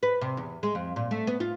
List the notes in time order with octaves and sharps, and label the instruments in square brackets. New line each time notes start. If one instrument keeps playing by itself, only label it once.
[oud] B4
C3
E2
G#3
F2
A#2
A3
B3
F4